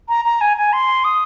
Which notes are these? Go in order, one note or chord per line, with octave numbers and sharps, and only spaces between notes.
A#5
A#5
G#5
G#5
C6
D#6